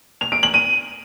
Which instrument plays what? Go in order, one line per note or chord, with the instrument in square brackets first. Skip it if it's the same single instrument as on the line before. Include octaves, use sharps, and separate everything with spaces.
[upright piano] F7
D7
F#7
D#7